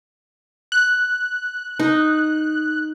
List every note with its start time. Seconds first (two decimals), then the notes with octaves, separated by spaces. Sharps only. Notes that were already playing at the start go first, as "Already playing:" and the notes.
0.72 F#6
1.79 D#4